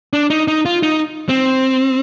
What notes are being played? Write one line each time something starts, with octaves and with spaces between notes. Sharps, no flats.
D4
D#4
D#4
F4
D#4
C4